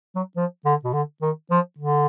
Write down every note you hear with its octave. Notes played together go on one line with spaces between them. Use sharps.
F#3
F3
D3
B2
D3
D#3
F3
D3